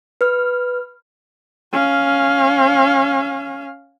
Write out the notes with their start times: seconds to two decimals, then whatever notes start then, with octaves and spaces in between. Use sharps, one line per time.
0.21 B4 F6
1.73 C#4 F5